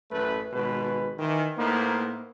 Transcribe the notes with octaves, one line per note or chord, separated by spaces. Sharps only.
A1 F#2 A3 B4
G#1 B2 G#3 B4
D#3 E3
A2 A#3 B3 D#4 C5